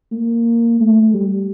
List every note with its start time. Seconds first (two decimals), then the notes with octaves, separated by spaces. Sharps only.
0.12 A#3
0.80 A3
1.13 G3